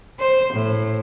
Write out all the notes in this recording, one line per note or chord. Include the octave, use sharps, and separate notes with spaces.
C5
A2